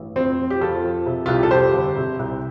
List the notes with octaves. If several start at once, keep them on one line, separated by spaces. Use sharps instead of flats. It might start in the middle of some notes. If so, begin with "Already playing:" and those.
Already playing: A1 G2
F2 C4
F3
G4
F2 F4 A4
F3
C3
C2 F4
G4
A4
F2 G4 C5
G1
C3
C2